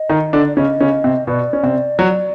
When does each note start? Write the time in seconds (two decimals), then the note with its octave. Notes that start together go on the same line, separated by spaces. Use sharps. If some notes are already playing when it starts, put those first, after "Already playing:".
Already playing: D#5
0.09 D#3 D#4
0.33 D3 D4
0.47 D5
0.57 C#3 C#4 D#5
0.80 C#3 C#4
1.04 C3 C4
1.27 B2 B3 D5
1.53 C#4
1.63 C3 C4
1.99 F#3 F#4